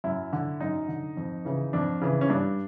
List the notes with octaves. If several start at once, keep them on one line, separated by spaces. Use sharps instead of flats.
F#2 E4
D3
F#2 D#4
D3
F2
C#3 E3
F2 D4
C#3 E3
C#4
G2 D4